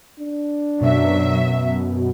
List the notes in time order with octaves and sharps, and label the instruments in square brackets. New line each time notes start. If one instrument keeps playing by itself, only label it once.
[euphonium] D4
[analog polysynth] F#2 B2 [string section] F#3 E5